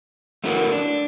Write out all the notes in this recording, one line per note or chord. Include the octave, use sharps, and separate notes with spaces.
A3 C#4 E4 F#4 A#4 B4
D4